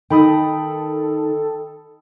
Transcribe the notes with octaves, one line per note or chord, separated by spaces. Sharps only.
D#3 D#4 A4 G5 B5 D#6